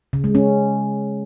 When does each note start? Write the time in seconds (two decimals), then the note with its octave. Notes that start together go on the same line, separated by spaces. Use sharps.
0.13 C#3
0.24 G#3
0.35 C#4